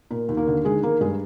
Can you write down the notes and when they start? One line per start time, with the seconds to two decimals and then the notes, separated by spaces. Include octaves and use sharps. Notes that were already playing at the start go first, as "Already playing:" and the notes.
0.11 A#2 A#4
0.29 D#2
0.37 A#3 A#4
0.47 D3
0.65 D#3 G#3 G#4
0.83 D#3 A#3 A#4
1.01 G2 G#3 G#4